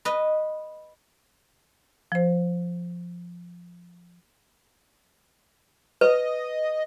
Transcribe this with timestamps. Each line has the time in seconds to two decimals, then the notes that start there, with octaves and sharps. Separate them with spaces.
0.05 B4 D#5
2.12 F3 C5
6.01 B4 D#5